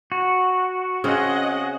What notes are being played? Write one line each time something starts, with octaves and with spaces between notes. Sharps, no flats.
F#4
C#3 C4 G#4 D#5 F#5